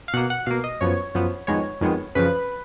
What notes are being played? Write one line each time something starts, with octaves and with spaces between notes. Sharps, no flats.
F5
B2 A#3 F#5
F#5
B2 A#3 F5
D#5
F#2 F3 B3 C#5
F#2 F3 B3
F2 D#3 G#3 B3 C#5
F2 D#3 G#3 B3
F#2 C#3 F3 B4